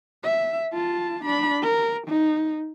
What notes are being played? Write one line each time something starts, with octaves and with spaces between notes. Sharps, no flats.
E5
F4 A5
D4 B5
A#4
D#4